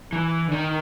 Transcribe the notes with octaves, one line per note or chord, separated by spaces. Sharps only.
E3
D3
D#3